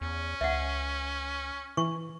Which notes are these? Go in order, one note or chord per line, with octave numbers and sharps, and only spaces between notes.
E2 C#4
C#2 E5 F#5
E3 C#6